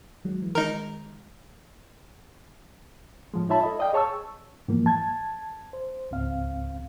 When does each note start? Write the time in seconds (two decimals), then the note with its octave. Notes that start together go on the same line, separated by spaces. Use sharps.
0.25 D#3 F#3 G#3
0.42 E3
0.55 D#3 G#3 D#4 A#4
3.34 A2 F3 G#3
3.49 D#4 F4 C#5 E5 A5 B5
3.63 A4 D#5
3.79 D5 D#5 F5 G5
3.93 G#4 C#5 A5 C#6 E6
4.68 G#2 E3 F3 A#3
4.86 A5 G#6
5.73 C5
6.11 C#2 G#2 C4 F5